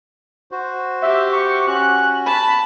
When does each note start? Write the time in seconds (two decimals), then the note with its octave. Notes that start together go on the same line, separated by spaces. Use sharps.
0.51 F#4 C5
1.02 G4 E5
1.32 C#6
1.68 C#4 F#4 F#6
2.26 A5 B5